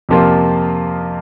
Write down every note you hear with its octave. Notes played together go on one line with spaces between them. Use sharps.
F2 C3 F3 A#3 F4